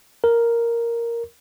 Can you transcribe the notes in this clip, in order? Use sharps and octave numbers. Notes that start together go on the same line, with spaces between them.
A#4